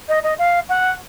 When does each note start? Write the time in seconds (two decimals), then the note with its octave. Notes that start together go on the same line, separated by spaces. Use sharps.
0.08 D#5
0.23 D#5
0.38 F5
0.69 F#5